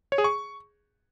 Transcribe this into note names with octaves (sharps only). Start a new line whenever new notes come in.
C#5
G#4
C#6